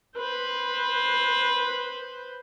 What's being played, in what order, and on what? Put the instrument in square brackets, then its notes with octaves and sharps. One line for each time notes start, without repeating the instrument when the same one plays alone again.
[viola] B4 C5